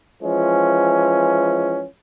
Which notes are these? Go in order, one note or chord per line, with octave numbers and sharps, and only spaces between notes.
E3 F3 G#3 C#4